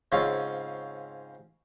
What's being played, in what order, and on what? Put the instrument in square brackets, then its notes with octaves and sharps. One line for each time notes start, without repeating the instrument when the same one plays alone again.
[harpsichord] G#2 C#3 C4 C#4 F4 F5